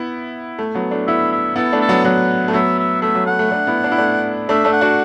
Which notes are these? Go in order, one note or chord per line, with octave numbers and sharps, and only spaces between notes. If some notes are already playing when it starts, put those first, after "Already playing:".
Already playing: B3 E4
A3
F#3 B3
A3 D4
B3 E4 E5
E5
B3 E4 A4
A3 D4
A4
F#3 B3
F#3 B3 F#5
A3
F#3 B3 E5
E5
A3 E5
F#3
A3 F#5
A3
A3 D4
B3 E4
D4
E4
A3 D4
A3 D4 E5
A3 D4
F#5
D4 F#4